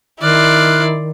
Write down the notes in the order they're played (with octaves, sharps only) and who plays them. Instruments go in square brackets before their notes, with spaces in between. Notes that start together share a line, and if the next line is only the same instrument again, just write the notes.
[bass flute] D#3 [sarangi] E4 [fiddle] D5 C6 [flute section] F6 F#6